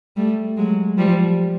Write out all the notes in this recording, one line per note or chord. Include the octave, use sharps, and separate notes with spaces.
G3 A3
F#3 G#3
F3 G3